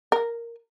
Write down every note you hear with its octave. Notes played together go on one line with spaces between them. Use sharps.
A#4